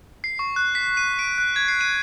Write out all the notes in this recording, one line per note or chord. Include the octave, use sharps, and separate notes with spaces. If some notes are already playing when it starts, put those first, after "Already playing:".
C7
C#6
F#6
B6
D#7
D7
F#6
G#6
C7
D#7